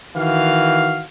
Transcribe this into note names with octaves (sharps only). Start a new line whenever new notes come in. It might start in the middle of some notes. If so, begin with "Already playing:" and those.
D#3 E3 F#4 F5